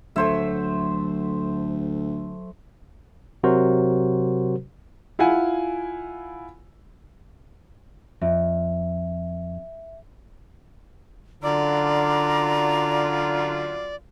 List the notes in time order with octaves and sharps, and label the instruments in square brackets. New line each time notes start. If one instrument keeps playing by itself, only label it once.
[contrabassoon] D2 [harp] F#3 [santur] A3 C5 E5
[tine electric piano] C3 F#3 F#4 A#4 C5
[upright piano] E4 F4 F#5 G#5
[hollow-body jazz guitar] F2 [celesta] E5
[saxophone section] F#2 F#3 F4 [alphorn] D3 [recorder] D5 [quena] A#5